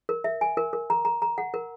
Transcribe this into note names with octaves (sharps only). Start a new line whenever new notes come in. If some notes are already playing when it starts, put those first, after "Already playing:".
A#4
E5
G#5
A#4
A#4
A#5
A#5
A#5
F#5
A#4